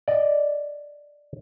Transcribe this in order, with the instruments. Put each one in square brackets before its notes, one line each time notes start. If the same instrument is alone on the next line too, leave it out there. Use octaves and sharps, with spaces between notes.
[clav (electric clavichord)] D5 D#5